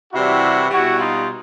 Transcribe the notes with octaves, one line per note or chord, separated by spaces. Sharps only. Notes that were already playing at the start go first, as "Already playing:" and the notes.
C3 E3 G3 E4 F#4
B2 G3 E4 F#4
D#4 F4